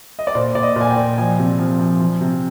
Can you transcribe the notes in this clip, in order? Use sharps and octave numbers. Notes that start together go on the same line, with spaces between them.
D#5
D5
A#2 C5
A#2 D5
D#5
A#2
G#5
G5
A#2
F3 G#5
C3
F3
F3
F3
C3